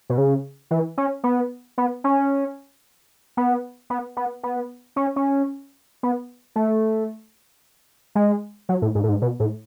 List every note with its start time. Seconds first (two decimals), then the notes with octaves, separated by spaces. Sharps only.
0.10 B2
0.18 C#3
0.71 E3
0.98 C#4
1.24 B3
1.78 B3
2.04 C#4
3.37 B3
3.90 B3
4.17 B3
4.43 B3
4.96 C#4
5.16 C#4
6.03 B3
6.56 A3
8.15 G#3
8.69 F#3
8.82 A2
8.95 G#2
9.04 A2
9.09 G#2
9.22 B2
9.40 A2